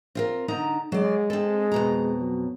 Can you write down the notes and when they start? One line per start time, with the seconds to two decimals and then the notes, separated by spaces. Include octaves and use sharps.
0.15 C4 F4 A#4
0.48 D3 D#4 A#5
0.92 F#3 G#3 D5
1.30 C4 A4
1.72 F2 B2 A#5
2.20 F#3